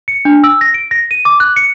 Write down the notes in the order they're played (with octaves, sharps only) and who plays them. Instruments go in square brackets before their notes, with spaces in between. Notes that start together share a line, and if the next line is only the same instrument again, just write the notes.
[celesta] C#7
D4
E6
A#6
D7
A#6
D#7
D6
F#6
C#7